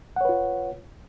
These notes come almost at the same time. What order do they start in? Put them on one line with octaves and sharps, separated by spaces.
F#5 C#5 B4 F4